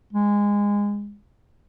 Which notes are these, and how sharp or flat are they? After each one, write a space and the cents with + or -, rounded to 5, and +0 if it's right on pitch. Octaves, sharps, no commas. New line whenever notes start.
G#3 -20